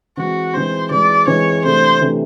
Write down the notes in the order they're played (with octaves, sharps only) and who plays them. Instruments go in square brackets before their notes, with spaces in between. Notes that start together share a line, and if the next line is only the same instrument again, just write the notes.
[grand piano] E3 G#3 C4 [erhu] F#4
[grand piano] E3 G#3 C4 [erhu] C5
[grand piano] E3 G#3 C4 [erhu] D5
[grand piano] E3 G#3 C4 [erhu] C#5
[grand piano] C3 E3 A3 D4 [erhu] C5
[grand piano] C3 E3 A3 D4